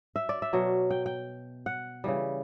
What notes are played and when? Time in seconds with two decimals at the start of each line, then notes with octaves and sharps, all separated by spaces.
0.16 E5
0.29 D5
0.42 E5
0.53 B2 F#3
0.90 G5
1.06 G5
1.66 F#5
2.04 C#3 E3 G3